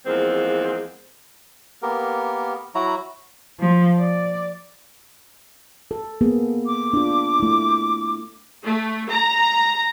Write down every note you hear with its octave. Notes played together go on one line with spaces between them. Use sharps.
E2 F3 G#3 A#3 C4
A#3 B3 G4 A#4
F#3 E4 F#4 A#5
F3
D5
A4
A#3 B3 G#4
D6
D4 F4
A3 E4
A3
A#5